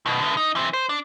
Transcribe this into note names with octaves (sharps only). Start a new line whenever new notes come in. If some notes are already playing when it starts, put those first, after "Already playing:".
B2 D#3
D3 B3
D#4
E3 C4
C5
D4